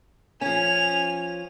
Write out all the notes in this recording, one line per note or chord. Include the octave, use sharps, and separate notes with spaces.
F3 C#4 G#5 F7